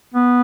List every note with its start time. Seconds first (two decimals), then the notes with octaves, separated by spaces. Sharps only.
0.15 B3